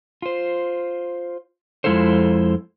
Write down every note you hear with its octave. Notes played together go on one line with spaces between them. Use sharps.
F4 C5
F2 G#3 E4 F4 A4 C5